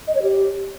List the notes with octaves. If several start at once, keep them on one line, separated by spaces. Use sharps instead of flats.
D#5
C#5
G4